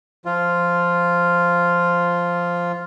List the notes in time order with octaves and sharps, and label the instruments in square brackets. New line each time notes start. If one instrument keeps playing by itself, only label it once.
[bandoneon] F3 F4